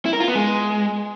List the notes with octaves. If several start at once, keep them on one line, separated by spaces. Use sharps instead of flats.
E4
A#4
F4
B3
G#3